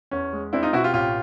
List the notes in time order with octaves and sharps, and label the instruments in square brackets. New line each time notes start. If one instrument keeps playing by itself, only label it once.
[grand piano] E2 C#4
G#3
C4 D4 E4
D#4 F4
B2 E4 F#4
F4 G4
A1 F4 G4